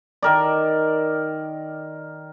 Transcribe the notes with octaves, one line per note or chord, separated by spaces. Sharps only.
D#3 A#4 D5